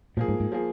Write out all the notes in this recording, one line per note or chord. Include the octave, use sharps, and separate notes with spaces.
A#2 F3 A#3 G#4
G#2
G#2
F3 A#3 G#4